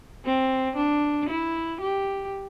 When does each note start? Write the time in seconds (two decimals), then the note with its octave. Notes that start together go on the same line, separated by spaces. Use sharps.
0.25 C4
0.76 D4
1.29 E4
1.81 G4